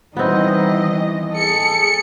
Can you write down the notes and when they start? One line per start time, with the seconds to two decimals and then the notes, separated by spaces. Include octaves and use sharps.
0.17 D#3 E3 G3 B3 C4 D#5
1.33 G#4 A4 C#7